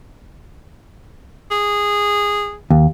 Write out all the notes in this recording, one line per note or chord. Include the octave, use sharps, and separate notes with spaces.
G#4
D#2